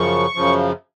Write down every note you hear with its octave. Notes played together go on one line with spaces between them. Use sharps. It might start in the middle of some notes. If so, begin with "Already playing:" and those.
Already playing: F#2 C#3 F3 C#6
F#2 C#3 F3